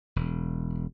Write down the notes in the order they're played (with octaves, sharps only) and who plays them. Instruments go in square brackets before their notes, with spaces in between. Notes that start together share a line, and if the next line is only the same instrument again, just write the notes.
[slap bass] E1